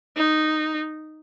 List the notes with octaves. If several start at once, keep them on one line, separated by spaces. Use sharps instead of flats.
D#4